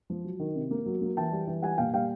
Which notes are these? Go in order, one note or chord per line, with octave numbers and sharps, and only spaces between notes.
F3
F#3
D#3
C3
A#3
F#3
A#3
E3 G5 A5
G3
E3
G3 F#5 G#5
A#2 F5 G5
G3 F5 G5